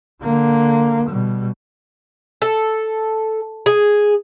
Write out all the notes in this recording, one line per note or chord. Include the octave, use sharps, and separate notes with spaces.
D3 A#3
B2 G3
A4
G#4